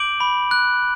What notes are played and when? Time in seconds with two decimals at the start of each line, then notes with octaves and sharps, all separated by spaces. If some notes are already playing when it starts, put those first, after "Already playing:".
Already playing: D6 G6 D7 F#7
0.20 B5
0.51 F#6